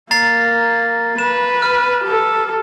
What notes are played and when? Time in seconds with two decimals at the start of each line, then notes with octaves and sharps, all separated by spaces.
0.11 A#3 A#5 A6 C7
1.18 B4 E7
1.62 F6
2.04 G4 A4